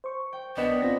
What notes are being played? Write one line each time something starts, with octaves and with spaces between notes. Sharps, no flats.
C5 C#6
G5
A#1 B3 D4 B4 D#5 G5 E7
G#1 C4 F4 A#6